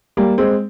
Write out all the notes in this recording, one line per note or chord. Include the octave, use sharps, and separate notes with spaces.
G3 A#3
G#3 C4